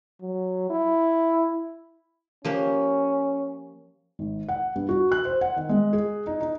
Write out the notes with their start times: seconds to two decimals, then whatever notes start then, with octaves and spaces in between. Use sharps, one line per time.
0.22 F#3
0.70 E4
2.45 F3 A#3 C#4 G4
4.19 G#1
4.49 F#5
4.76 G2
4.89 F#4
5.12 F#6
5.25 C5
5.41 F#5
5.56 D#3
5.69 G#3
5.93 G#4
6.27 D#4
6.41 D#4